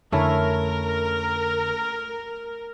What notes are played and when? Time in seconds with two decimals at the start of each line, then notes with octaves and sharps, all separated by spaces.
0.12 F2 D3 A3 C#4 E4 A#4